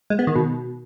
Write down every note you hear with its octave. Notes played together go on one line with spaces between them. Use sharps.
G#3
B3
D#3
B2